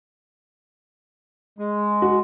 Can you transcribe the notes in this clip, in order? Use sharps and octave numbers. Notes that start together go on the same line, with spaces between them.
G#3
F#4